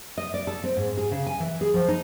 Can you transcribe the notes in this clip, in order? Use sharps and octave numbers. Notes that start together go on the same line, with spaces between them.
D#5
D5
A4
C4
G#2
G#4
C#3
G#5
E3
G#4
F3
D#4